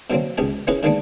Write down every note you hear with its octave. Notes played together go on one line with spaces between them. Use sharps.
B2 D3 F#3 A#3 C4
C#2 B2 G4 G#4
B3 C#4 E4 G#4 A#4 B4
D3 D#3 G#3 A#3 B3 D4